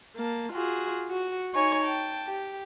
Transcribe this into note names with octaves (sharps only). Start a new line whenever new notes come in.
A#3 A5
F4 F#4 G#4
F#4
D#4 C#5 G#5 C#6
G5 A5
G4